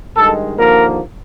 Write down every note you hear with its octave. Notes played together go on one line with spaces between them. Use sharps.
G2 D#3 G#3 A4
D#2 D3 F3 A#3 A#4